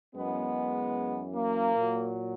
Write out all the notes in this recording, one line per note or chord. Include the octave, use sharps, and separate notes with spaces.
F#2 E3 G#3 B3
A#3
A#2 F#3